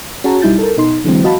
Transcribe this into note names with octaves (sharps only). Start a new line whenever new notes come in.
C#4 F#4 G#4 C#5 A5 A#5
B1 G3 D#4 E4 G6 A6
A4 A#4
B2 D#4 C6
D3 E3 F#3 G#3 C4
F#4 D#5 F5 A5 B5